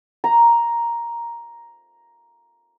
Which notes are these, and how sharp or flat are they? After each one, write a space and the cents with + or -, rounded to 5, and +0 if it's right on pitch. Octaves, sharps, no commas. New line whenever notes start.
A#5 +5